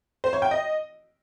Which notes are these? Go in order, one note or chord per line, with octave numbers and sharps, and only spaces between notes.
C5
C#5
G5
D#5